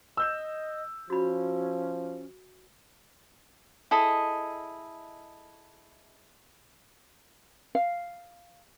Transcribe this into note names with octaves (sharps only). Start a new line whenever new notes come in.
D#5 E6 G6 E7
F3 C#4 F#4 B5
E4 G#4 A4 D#5
F5